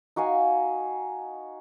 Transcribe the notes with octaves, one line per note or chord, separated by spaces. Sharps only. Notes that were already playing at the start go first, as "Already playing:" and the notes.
D#4 F#4 F5 G#5